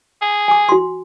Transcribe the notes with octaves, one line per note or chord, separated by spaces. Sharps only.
G#4
G#5 D6
F#4 C6